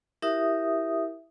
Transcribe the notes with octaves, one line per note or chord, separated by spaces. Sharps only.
E4 G4 A#4 E5 D#6